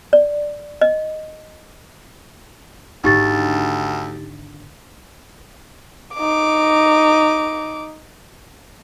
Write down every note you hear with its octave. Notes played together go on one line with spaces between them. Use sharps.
D5
D#5
G#1 D2 D3 D#4 G4 A6
D#4 D6